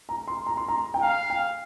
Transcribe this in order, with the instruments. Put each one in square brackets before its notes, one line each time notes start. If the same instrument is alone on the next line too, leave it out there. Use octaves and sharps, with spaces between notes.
[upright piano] A#5
C6
A#5
C6
A#5
G5
[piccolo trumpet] F5 [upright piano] A#5
[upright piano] G5